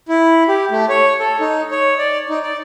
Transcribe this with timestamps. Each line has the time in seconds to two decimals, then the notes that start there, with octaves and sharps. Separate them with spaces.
0.09 E4
0.48 G4
0.71 A3
0.89 C#5
1.19 A4
1.40 D#4
1.71 C#5
1.98 D5
2.29 D#4
2.43 D5